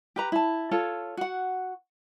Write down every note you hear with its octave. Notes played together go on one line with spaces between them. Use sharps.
G4 B4 A#5
E4 A5
F4 A4 C#5 A5
F#4 F#5